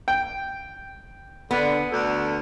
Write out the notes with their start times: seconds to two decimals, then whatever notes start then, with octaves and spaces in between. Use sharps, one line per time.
0.08 G5
1.51 D3 B3
1.92 D2 D3 A4